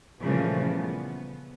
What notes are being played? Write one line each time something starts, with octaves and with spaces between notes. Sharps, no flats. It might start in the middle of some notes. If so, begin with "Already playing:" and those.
A#2 C#3 E3 F3 G3 A3
B3